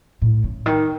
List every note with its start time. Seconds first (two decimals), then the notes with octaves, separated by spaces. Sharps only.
0.22 A2
0.44 C#3
0.66 D#3